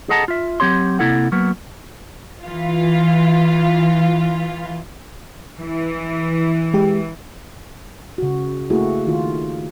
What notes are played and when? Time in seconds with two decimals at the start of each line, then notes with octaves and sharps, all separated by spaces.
0.09 G#4 A4 D#5 F#5 A5 A#5
0.28 F4 E5
0.60 F#3 C4 G4 C#5 C6
0.99 C3 D#3 A#3 E4 A4 F#5
1.32 F#3 A#3 B3
2.45 E3 F4
5.58 E3
6.74 G#3 G4
8.18 C#3 F#4
8.70 A3 A#3 E4 F#4 G#4
9.07 D#3 F4